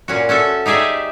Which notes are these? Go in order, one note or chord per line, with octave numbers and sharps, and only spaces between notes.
A#2 C#4 F#4
C#4 F#4 A4 E5
D#4 G4 G#4 D5 E5